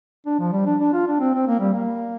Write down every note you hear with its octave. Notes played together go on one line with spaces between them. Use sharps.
D4
F3
G3
D4
D4
F4
D4
C4
C4
A#3
G3
A#3